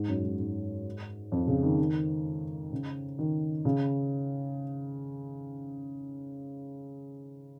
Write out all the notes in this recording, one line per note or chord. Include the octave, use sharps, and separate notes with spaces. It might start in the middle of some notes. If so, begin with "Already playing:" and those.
Already playing: G#2
F#2
G#2
G#2
F2
C#3
D#3
D#3
C#3
D#3
C#3